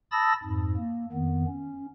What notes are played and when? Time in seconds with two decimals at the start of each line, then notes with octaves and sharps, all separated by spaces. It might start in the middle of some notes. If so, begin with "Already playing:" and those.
0.12 A5 B5 D#6 E6 A6 A#6
0.43 F2 G#2
0.77 A#3
1.13 F2 D#3 B3
1.48 C#4